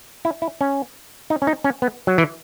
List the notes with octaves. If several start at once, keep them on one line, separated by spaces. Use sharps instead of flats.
E4
E4
C#4
D#4
C#4
D#4
C#4
B3
F#3
E3